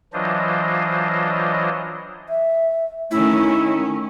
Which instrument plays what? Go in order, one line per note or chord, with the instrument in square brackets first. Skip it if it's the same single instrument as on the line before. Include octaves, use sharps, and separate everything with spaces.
[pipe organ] E3 F#3 D4 F4 C5 D#5
[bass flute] E5
[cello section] D#3 C#4 [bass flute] A3 [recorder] E4